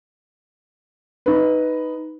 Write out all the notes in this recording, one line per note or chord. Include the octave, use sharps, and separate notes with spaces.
D#4 B4